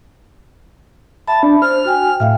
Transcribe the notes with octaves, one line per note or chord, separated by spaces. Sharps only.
E5 A5 B5
D4
C5 F6
F#4 G5 G#5
A2 E5 F5 G5